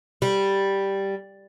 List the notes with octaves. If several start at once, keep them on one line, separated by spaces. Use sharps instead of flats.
G3